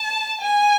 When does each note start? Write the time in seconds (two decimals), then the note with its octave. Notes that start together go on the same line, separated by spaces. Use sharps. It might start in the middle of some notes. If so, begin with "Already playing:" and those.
Already playing: A5
0.41 G#5